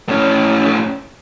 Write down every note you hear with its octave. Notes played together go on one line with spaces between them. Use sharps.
A2 C#4